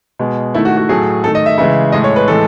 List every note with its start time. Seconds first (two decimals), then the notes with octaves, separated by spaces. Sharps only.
0.19 B2 G#3
0.54 D#3 A3 E4
0.65 F#4
0.77 F#4
0.89 A2 F#3 A3 G#4
1.24 D#3 A3 A4
1.35 D#5
1.46 E5
1.58 C#3 E3 G#3 E5
1.92 A2 G#3 D#5
2.04 C#5
2.16 B4
2.28 A2 E3 G#3 A4